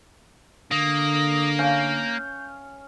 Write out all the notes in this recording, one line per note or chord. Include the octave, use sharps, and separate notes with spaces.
D3 A#3 D#6
C#4 F5 G6